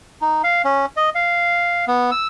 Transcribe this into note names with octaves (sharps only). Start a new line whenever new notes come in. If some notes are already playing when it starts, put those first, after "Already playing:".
D#4
F5
C#4
D#5
F5
B3
E6